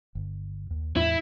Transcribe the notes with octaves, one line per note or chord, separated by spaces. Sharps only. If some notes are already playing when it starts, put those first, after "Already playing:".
G1
D#2
E2 A2 G#3 E4